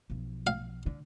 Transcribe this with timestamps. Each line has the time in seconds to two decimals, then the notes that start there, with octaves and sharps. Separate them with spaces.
0.10 B1 F3
0.47 F5
0.86 D3